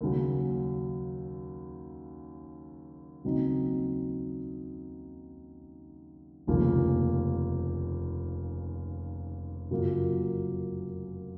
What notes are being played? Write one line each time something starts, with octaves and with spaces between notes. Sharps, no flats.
D#2 C#3 F#3
D#2 C#3 F#3 C4 D#4
F1 D#2 C#3 F3 A#3
F#2 C#3 F#3 A#3 F4